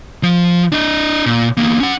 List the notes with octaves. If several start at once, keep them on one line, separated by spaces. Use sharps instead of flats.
F3
D4 D#5
A#2
E2 A#3
C#4 F#5